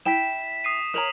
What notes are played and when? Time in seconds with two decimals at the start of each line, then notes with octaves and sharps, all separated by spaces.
0.05 E4 G5 B6 E7
0.64 D#6 C7 D#7
0.94 A#4 C#5 A#5 D#6 F7 F#7